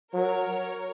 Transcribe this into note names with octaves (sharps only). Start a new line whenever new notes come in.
F#3 A#4 C#5